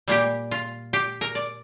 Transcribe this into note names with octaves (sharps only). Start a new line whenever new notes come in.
A#2 G3 A#3 G4
F4
G4
A#4
D5